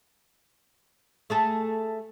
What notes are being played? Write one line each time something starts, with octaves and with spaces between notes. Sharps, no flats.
A3 G#4 A4